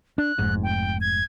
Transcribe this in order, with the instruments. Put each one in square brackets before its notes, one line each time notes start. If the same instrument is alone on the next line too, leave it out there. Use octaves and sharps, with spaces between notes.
[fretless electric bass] D4 [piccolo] F#6
[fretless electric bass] F1 G#2
[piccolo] G5
G#6